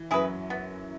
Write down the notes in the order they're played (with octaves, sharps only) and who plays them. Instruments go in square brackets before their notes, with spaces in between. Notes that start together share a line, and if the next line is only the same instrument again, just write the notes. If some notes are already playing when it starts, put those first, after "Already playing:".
Already playing: [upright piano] E3
[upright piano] F#2 F#3 [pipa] E4 G#4 B4
[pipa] B3